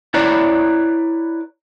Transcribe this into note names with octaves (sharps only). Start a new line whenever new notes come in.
E4 B4 C#5 D5 A#5